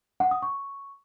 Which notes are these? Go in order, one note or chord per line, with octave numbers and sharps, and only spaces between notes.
F#5
D#6
C#6